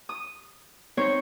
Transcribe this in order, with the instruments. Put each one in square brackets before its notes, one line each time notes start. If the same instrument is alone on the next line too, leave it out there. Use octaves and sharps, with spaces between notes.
[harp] D#6
C4 D#4 C5 C#5